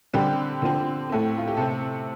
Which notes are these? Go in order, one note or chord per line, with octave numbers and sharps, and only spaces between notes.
D3 G3 C4 G4
D3 F3 C4
A2 A3 C4
F4
G4
C3 A3 C4 A4